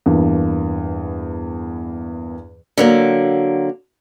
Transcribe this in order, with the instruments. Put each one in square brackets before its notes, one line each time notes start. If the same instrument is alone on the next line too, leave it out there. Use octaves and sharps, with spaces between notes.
[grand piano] E2 G2 A#3
[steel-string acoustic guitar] D3 F#3 A#3